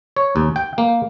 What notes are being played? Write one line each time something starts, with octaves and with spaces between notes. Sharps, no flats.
C#5
D#2
G5
A#3